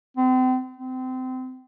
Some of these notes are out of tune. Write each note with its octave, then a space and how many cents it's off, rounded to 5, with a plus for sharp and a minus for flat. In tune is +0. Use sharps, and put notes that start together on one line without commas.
C4 -35
C4 -30